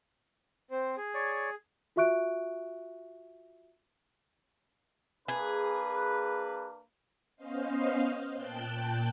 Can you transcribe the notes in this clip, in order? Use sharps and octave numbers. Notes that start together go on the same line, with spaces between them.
C4 C5
G#4
C#5 D5
F4 F#4 E5 C#6 F#6 D7
A#3 D4 G#4 B4
B3 C#4 C5 D#5 F5
A#2 G5 A5 F#6 G6